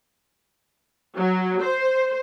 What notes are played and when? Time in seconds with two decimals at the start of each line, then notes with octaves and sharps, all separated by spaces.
1.16 F#3
1.63 C5